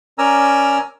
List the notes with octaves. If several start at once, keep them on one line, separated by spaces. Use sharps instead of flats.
C#4 A#4 D5 G#5 A#5 E6